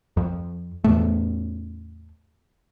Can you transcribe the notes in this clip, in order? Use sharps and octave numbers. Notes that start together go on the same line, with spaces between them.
F2
E2 A2 A3